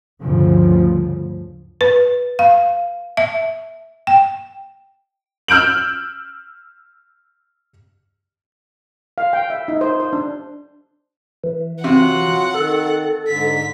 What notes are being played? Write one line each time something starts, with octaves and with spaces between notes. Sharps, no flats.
D2 G2 C#3 F3
B4
F5
E5
G5
E6 F6 G6 D7 F#7
F5
G5
E5
D#4
C5
C5
D4
E3
C3 F#3 F4 F#4 F#5
D#3 A4
G#2 D3 B6